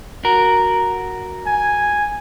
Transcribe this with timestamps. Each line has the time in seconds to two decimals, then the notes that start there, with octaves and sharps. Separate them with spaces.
0.25 F#4 A#4
1.47 G#5